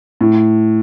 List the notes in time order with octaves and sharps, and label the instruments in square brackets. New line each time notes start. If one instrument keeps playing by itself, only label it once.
[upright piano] A2